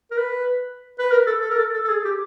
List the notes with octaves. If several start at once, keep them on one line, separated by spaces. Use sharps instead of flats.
A#4
B4
B4
A#4
A4
A4
A#4
A4
A4
A4
G#4
G4